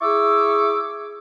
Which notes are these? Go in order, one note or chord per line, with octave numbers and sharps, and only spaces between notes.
E4 G#4 C#6 D6 E6